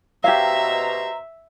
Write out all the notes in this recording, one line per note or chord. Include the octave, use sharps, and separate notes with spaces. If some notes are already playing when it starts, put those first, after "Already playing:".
B2 G4 C5 C#5 E5 F5 A#5